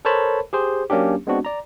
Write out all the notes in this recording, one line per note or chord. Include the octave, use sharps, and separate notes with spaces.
A4 A#4 C5 C#5 A5 B5
G4 G#4 C5
F#3 A#3 C#4 D4 G4
G#3 B3 C4 D4 F#4
D5 A#5